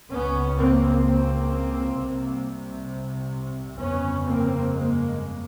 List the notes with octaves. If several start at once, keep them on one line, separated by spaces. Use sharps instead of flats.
C#2 C#3 B3 C#4
A#3 C4
A#3 C4
C2 C3
G1 F2 C#3 B3 C#4
A#3 C4
G#3 A#3